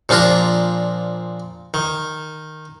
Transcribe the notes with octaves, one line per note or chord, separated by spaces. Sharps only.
A#2 F3 D4 F4 A#5
D#3